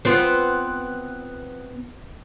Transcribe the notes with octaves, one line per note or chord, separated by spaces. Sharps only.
B3 C4 F4